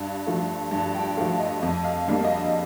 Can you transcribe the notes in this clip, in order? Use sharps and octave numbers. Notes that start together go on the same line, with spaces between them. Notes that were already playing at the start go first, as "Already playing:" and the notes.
Already playing: G2 F5
F3 A3
G2 A5
G5
F3 A3 F5
D#5
F2 D#5
F5
D3 G3 A#3 F5
D#5
F5